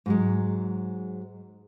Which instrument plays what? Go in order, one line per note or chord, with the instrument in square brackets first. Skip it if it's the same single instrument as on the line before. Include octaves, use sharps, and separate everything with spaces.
[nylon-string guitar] G#2 F#3 G#3